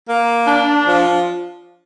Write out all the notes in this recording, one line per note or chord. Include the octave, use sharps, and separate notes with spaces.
A#3
D4
F3